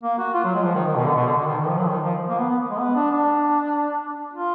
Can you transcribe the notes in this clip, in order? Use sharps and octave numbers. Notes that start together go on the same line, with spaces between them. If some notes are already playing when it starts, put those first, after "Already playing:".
A#3
F#4
F4
F#3
G#3
F3
D#3
D#3
B2
D3
B2
D3
D3
D#3
D#3
F3
F#3
D#3
F3
A#3
B3
B3
G#3
B3
D4
D4
F4